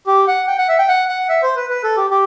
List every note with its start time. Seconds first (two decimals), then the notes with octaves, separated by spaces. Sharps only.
0.07 G4
0.28 F#5
0.48 G5
0.58 F#5
0.69 E5
0.79 G5
0.88 F#5
1.09 F#5
1.29 E5
1.43 C5
1.56 B4
1.70 B4
1.84 A4
1.97 G4
2.10 G4